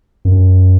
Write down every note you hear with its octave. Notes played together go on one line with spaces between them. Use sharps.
F#2